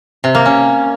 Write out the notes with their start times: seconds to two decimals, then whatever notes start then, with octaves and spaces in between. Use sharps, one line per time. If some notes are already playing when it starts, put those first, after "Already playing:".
0.24 C3
0.35 A#3
0.45 C#4